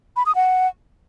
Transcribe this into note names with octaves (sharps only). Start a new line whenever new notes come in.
B5
D#6
F#5